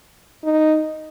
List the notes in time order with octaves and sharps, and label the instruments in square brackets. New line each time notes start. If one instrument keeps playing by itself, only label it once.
[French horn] D#4